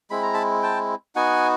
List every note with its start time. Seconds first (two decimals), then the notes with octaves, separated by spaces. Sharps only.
0.10 G#3 C4 E4 B5
0.22 A#5
0.34 A5 B5
0.62 G5 A5
1.15 B3 D#4 F#4 F#5 G#5